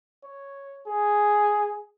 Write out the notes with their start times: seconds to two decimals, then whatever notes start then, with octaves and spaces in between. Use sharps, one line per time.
0.24 C#5
0.86 G#4